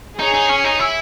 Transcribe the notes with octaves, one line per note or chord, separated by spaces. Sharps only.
D#4 G#4 C#5 G#5
D#4
C#4
D#4
E4